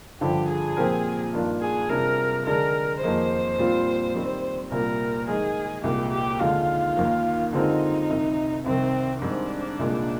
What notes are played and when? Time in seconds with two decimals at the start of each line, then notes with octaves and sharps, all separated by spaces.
0.21 G2 D3 F3 G4
0.49 G#4
0.77 A#2 F3 C4 G4 A#4
1.33 G2 D#3 A#3 D4 F4
1.61 G#4
1.89 C3 G3 D4 F4 G#4 A#4
2.46 D3 G#3 D4 G#4 A#4
3.02 F2 D#3 A#3 D#4 G#4 C5
3.58 A#2 G3 C4 F4
4.14 D#3 G3 C4 G4
4.71 C2 A#2 G3 A#4
5.28 D#3 G#3 D#4 G#4 A#4
5.84 C2 A#2 G#3 G4
6.12 G4
6.40 D#2 D3 G#3 F4
6.97 D#2 D#3 A#3
7.53 D3 G#3 C4 D#4 F4 A#4
8.10 C2 C3 D#3
8.65 C2 C3 D#3 C4
9.22 G#2 D#3 G3 C4 D4
9.79 C2 A#2 G#3